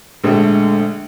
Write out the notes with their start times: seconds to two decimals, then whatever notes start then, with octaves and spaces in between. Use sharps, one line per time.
0.24 A#1 D3 G#3 A3